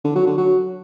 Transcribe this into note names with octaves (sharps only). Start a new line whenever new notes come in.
D3
F#3
D3
F#3